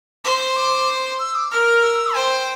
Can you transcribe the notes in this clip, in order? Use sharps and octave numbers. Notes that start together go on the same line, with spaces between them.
C5 C6 D6
D6
E6
D6
A#4 F6
E6
C5 G5